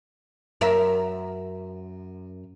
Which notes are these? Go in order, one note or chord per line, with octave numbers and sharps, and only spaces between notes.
F#2 A#4 E5